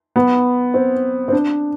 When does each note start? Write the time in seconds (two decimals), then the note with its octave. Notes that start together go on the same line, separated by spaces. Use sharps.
0.16 B3
0.74 C4
1.28 C4
1.32 D4